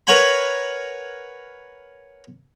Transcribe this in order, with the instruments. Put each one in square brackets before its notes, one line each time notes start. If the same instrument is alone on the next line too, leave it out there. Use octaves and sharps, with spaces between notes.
[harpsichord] A#4 B4 C#5 F#5 G#5 B5